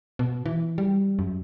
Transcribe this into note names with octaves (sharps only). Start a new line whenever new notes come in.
B2
E3
G3
F#2